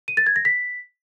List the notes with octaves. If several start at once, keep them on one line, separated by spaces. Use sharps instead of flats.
D#7
A6
G#6
A#6
B6